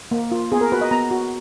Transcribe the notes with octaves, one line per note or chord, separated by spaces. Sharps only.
A#3
F4
B3 G#4
A#4
F#4 B4
D#5
B3 A#5
F#4